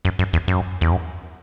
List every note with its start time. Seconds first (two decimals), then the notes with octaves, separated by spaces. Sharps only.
0.05 F#2
0.19 F#2
0.33 E2
0.48 F#2
0.81 E2
0.92 F#2